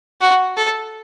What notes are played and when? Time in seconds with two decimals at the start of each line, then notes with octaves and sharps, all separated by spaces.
0.21 F#4
0.57 A4